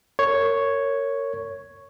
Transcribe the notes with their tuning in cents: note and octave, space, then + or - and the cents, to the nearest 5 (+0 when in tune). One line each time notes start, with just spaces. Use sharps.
A#4 -25 C#5 +0